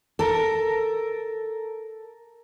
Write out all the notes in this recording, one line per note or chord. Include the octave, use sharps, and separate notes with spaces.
A4 A#4